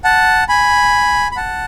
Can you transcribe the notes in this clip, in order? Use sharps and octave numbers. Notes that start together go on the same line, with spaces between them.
F#5 A5
G#5 B5
B5
F#5 A5